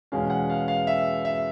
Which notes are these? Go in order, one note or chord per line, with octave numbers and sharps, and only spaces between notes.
E2 B2 G#3 C#4 F5
F#5
F5
F5
E5
E5